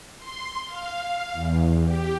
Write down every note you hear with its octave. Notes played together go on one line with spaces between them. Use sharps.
C6
F5
E2
G4